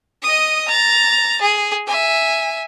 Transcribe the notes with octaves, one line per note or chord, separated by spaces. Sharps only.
D#5 D#6
A#5 A6
G#4
E5 G#5